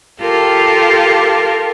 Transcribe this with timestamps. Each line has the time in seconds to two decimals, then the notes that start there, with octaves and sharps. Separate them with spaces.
0.19 F4 G4 A4 A#4